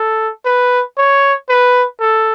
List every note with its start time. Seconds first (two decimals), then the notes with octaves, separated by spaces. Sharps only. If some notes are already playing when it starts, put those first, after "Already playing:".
Already playing: A4
0.45 B4
0.97 C#5
1.49 B4
2.00 A4